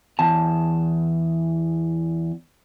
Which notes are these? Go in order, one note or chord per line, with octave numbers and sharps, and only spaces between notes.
E2 A5